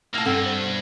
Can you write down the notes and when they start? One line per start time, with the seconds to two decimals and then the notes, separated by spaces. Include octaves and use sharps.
0.14 A2 A#3 A5 F6
0.26 G2 C4 A4 F#5
0.46 C5
0.63 B2